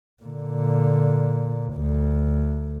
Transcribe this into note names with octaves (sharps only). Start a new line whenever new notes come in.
A#2 D3
D2